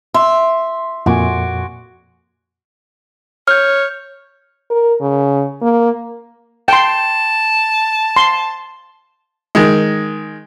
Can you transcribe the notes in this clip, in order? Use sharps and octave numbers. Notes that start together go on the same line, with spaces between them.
E5 C6
F2 A#2 F#4 G#5 D6
C#5 F6 G6
A#4
C#3
A#3
G5 A5 C6
C6
D#3 G#3